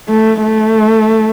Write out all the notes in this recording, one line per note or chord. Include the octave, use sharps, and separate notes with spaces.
A3
A3